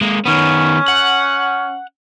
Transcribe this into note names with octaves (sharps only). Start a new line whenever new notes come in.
G#3 A#3
D#3 B3 C#4
F#5